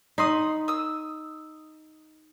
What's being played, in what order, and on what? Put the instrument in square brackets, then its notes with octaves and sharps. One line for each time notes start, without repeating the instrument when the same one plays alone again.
[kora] D#4 [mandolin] B5 C6 D#6
[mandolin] D#6 E6